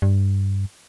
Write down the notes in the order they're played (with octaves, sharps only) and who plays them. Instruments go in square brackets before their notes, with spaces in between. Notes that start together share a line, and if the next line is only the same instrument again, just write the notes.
[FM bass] G2